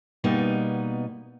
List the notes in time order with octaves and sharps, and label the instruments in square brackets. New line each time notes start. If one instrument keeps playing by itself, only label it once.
[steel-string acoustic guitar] B2 G3 A#3 B3 D#4